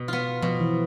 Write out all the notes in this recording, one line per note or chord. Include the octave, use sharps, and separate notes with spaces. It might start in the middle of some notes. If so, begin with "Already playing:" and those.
Already playing: B2
B3 F4
B2 F3
E3